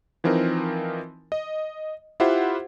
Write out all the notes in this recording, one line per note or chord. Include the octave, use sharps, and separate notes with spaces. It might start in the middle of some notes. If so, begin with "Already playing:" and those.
E3 F3 C4 D#4 A#4
D#5
E4 F4 G4 C5 E5 F#5